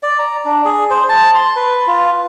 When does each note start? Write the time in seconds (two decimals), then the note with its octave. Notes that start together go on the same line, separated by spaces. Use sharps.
0.03 D5
0.19 A#5
0.45 D4
0.65 G#4
0.90 C5
1.09 A5
1.35 C6
1.56 B4
1.87 F4